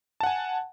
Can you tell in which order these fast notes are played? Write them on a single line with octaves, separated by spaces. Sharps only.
A5 F#5 G#5